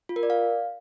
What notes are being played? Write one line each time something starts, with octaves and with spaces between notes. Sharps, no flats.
F4
A#4
D5
F5